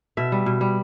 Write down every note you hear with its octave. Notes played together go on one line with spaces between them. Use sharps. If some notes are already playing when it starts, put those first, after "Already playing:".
B2 E5
G3
B2
G3